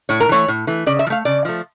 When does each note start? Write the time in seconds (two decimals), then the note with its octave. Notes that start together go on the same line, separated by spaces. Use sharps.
0.09 A2 C#5
0.20 A#4
0.29 E3 A3 C#5
0.48 A2
0.67 E3 A3
0.86 C#3 D5
0.99 E5
1.07 F3
1.10 A3 F5
1.25 C#3 D5
1.45 F3 A3